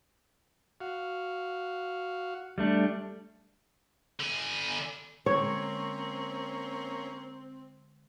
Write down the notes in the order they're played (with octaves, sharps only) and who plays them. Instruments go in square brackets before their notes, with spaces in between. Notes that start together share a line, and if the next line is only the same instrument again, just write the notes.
[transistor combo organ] F#4 F5
[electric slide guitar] G3 A3 D4
[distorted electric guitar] D3 G#5
[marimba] D3 G#3 [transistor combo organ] A#3 C#4 [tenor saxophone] C4 [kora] C#5